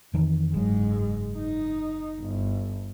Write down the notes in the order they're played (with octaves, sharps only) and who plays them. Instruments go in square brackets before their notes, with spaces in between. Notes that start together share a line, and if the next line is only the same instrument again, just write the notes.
[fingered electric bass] F2 D#3 E3
[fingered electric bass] F#1 F#3 [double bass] G#2 G#3
[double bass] D#4
G1